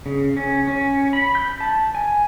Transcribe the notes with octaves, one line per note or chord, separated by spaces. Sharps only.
C#3
C#4
C#4
B5
G6
A5
G#5